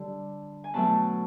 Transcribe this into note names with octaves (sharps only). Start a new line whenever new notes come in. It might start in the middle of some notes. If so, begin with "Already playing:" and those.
Already playing: D3 G3
G#5
B2 F#3 A3 A5